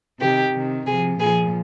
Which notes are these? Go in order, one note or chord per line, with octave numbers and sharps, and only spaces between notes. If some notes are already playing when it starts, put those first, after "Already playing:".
C3 D#3 G4
C3 D#3
C3 F3 G#4
A#2 F3 G#4